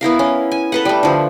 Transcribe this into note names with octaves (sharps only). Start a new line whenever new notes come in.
B3 E4 A#4 F5
C#4
G#5
A4 B4 F#5
G3 A3
D3 F3